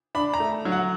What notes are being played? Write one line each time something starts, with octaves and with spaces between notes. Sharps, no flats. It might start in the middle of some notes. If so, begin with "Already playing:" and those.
D4 B5
A#5
A3
F#3
F#5